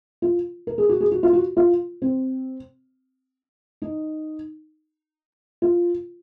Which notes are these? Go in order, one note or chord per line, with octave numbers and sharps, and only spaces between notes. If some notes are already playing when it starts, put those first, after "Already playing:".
F4
A#4
G#4
F#4
G#4
F#4
F4
F#4
F4
C4
D#4
F4